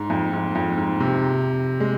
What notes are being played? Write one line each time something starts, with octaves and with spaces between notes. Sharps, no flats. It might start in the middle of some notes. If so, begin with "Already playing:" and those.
Already playing: G#2
F2
G#2
F2
G#2
C3
G#3